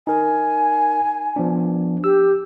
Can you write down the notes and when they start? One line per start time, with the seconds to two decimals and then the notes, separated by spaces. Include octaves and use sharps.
0.07 D#4 A#4 G#5
1.36 F3 B3 D4
2.04 G4 E6